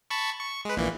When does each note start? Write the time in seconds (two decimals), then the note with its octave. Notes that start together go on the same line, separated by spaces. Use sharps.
0.10 A5 B5 C#6
0.41 C#6
0.65 G#3 B4
0.77 A#1 A#2 E3